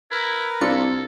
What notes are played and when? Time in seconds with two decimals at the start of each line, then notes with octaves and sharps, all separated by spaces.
0.11 E4 A#4 B4 A#5
0.61 C2 D4 F4 A4 C#7